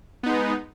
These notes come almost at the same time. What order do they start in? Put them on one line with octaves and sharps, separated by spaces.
B3 D#4 G#3